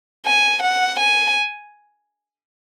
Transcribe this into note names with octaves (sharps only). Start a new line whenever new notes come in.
G#5
F#5
G#5